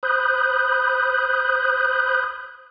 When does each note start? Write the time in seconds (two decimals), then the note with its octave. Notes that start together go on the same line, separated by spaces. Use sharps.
0.03 C5 B5 D#6 F#6 G6